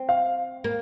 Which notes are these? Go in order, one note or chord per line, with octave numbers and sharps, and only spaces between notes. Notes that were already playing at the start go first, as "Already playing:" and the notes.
Already playing: C4
F5
A#3